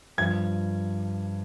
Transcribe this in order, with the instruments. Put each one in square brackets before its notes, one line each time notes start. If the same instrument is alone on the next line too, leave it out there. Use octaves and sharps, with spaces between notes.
[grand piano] G2 F3 G#6